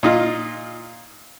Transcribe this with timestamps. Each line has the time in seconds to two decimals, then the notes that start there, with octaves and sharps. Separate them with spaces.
0.03 A#2 D#4 F4